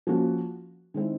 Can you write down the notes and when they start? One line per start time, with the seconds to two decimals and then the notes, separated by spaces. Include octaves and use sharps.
0.07 F3 A#3 C#4 F#4
0.94 D#3 G#3 C4 E4